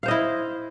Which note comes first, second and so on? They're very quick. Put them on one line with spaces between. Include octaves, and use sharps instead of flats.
F5 C5 D#5 E4